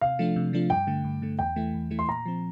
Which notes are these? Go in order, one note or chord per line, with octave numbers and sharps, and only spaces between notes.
C3 F5
F3 A3 D4 F4
C3
F3 A3 D4 F4
G2 G5
D3 A3
G2
D3 A3
E2 G5
E3 A3 E4
E2
E3 A3 E4
C6
A#2 A#5
F3 C4